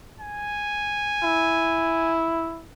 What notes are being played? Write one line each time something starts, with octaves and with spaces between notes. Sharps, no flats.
G#5
E4